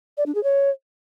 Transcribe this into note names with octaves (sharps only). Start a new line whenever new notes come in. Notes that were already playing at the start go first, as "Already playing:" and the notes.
D5
D4
G#4
C#5